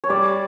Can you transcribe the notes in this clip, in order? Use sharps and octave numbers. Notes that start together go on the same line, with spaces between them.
C#5
G3 D5